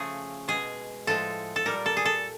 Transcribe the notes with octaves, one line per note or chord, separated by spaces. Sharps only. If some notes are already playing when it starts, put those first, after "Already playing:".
Already playing: C#3 F3 A3 G#4
B2 G#3 G#4
A2 F3 G#3 A4
A4
A#2 G3 A#4
A4
G#4
A4